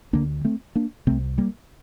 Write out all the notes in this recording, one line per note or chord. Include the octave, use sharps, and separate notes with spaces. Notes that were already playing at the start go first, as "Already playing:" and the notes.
D2 D3 A#3 D4
A3 C4
A#3 D4
C2 C3 A3 C4
G3 A#3